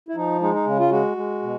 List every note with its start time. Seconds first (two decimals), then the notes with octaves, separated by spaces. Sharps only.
0.09 E4
0.15 F3 D#4
0.41 G#3 D#4
0.54 D#4
0.66 C#3
0.79 F4
0.91 G#3 F#4
1.17 G#3
1.42 B2